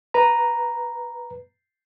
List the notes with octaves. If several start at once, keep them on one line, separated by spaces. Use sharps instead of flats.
B4 A#5